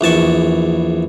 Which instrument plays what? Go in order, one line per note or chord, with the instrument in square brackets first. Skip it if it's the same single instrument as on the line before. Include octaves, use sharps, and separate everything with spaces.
[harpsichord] A#1 E2 A5 C#6